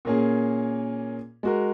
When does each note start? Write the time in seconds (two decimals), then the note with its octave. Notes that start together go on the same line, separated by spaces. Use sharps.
0.05 A#2 A#3 C#4 G#4
1.43 G#3 F#4 A#4